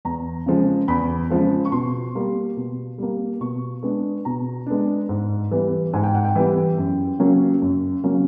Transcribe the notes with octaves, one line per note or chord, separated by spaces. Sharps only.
E2 A#5
C#3 F3 G#3
E2 B5
C#3 F3 G#3
C#6
B2 C6
G3 A#3
B2
G3 A#3
B2 C#6
G#3 B3 D4
B2 A#5
G#3 B3 D4
G#2
E3 G3 B3
G#2 G#5
G5
F#5
G5
E3 G3 B3
F#2
C#3 F#3 A#3 C#4
F#2
C#3 F#3 A#3 C#4